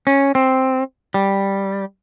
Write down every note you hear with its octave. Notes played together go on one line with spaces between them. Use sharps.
C#4
C4
G3